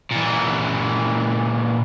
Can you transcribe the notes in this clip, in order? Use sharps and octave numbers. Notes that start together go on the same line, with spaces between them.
A#2 E3